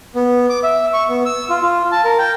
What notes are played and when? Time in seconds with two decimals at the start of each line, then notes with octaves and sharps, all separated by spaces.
0.15 B3
0.49 D6
0.63 E5
0.93 C#6
1.09 B3
1.26 E6
1.50 F4
1.62 F4
1.92 A5
2.05 A#4
2.19 G5